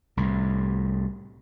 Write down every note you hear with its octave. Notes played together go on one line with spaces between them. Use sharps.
C2 A2